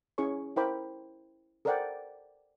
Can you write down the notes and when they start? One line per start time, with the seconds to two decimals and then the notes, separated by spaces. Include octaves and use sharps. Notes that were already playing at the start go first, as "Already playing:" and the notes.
0.18 C#4 E4 G#4 C#5 C#6
0.56 E4 A#4 C5 G5 B5 D6
1.65 A4 A#4 C5 D5 F#5 G5